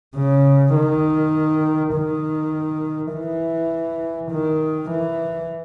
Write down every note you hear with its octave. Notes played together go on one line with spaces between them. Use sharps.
C#3
D#3
D#3
E3
D#3
E3